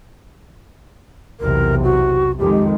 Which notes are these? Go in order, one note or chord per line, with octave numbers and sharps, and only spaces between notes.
B1 E2 C3 A#4
F#4
F2 D#3 G#3 G4